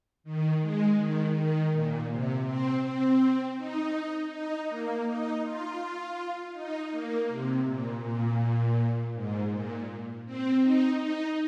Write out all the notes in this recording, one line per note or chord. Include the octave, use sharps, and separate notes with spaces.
D#3
G#3
D#3
D#3
A#2
C3
C4
C4
D#4
D#4
A#3
D#4
F4
D#4
A#3
C3
A#2
A#2
G#2
A#2
C4
D#4
D#4